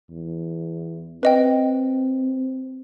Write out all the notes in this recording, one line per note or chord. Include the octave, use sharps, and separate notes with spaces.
E2
C4 B4 D#5 G5